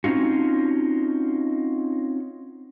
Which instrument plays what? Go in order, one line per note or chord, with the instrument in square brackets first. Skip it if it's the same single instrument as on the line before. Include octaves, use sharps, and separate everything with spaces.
[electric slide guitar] C4 C#4 D#4 F4 F#4